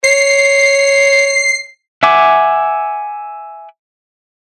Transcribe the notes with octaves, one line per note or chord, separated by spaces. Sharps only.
C#5 C7
E5 F#5 G#5 D6